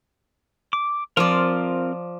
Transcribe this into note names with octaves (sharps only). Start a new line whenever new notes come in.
D6
F3 C4 F4 A#4 D5